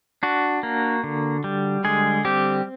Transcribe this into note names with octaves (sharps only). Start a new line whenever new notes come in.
D4 F#4
A#3
D3
G3
D3 G#3 G#4
G3 C4 G4